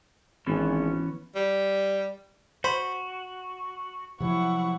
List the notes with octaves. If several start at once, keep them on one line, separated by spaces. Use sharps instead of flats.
G#1 E3 B3 C#4
G3
F#4 C5 B5
C3 F3 F#3 E4 F#5 C#6